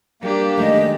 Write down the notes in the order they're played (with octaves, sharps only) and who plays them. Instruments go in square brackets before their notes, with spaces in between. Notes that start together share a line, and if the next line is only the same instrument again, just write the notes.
[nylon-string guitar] G3 [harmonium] A#3 [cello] D4 G4
[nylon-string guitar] D#3 G#3 A3 [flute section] D#5